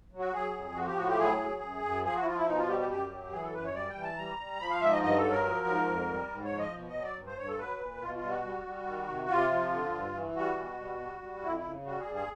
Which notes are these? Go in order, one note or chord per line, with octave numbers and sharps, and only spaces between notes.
F#3
F#4
F#3 G#4
F2
F3 F#4
G4
A2 F#4
G4
F#3 G#4
F#3
F#2
F#2
F3 G#4
F#4
E4
F3 F4
E4
B2 D#4
F4
G3 G4
G4
F#2 G4
F#3
E3 G#4
A4
F#2 B4
C#5
G3 D5
G5
E3
A5
G3 A#5
G3
F3 B5
F5
G#2 E5
D#5
G2 D#5
A4
F#3
A#4
F3
G#2
F2
G3
G#2
C#5
F3
D#5
B2
D#5
F#3
D5
G2
C5
G2 C#5
A4
F#3 B4
A#2
B2 F4
F4
G3
F#4
G3
G3
D#3
C3
C3 F4
F3
D3
G2
E3
G3 F#4
B2
G3
G3
G3
F2 E4
E4
C#3
G3 F#4
G#4
G2
G#4